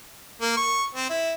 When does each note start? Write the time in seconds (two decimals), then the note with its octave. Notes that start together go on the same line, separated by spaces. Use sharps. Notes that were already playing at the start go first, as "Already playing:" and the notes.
0.42 A#3
0.57 C#6
0.95 C4
1.10 E4